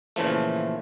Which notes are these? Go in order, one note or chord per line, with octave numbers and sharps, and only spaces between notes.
A#2 C#3 E3 F3 A3